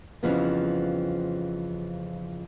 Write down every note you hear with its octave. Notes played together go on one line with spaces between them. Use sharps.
F2 C#3 E3 F3 G3 B3